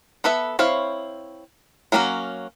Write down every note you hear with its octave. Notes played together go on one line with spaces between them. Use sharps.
B3 A4 B4 E5
C4 E4 C#5 F5
F#3 A#3 C#4 D4 F#4